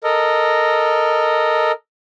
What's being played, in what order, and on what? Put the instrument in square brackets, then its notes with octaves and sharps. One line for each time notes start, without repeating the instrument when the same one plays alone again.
[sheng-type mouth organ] A4 A#4 D#5